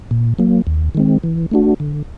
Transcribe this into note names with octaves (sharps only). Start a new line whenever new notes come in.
A#2
F#3 A#3
D#2
D#3 G#3 C4
E3
A3 D4 F#4
D3